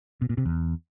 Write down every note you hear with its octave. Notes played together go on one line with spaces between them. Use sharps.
B2
A#2
C3
E2